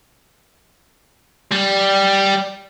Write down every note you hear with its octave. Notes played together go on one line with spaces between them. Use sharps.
G3